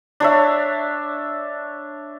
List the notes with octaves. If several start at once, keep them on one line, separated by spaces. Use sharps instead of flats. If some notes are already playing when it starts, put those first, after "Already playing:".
D4 C#5 E5